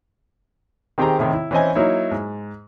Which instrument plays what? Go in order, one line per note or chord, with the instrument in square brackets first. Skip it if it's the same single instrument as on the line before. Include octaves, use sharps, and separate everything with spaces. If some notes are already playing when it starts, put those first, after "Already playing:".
[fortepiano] D#3 C4 G4 G#4 G5 A#5
A2 C3 D#3
E4
E3 C4 C#4 C5 D#5 G#5
F#3 A#3 D#4 E4 C#5
G#2